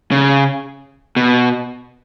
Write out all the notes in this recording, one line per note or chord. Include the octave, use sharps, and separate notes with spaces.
C#3
B2